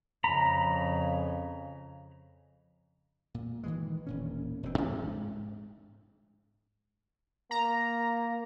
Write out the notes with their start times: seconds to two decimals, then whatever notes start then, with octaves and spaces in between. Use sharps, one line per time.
0.24 F2 C#3 A#5 B5
3.34 A#2
3.63 D#3 E3 G#3
4.07 E1 A#2 C#4
4.63 F1 B2 E3 C4
4.78 G#2 D4
7.51 A#3 A#5